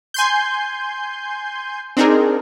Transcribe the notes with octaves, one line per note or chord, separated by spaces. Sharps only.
G#5 C6 G6
C4 D4 D#4 G#4 A#4